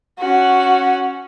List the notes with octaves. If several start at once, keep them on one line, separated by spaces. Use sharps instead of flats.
C#4 F#4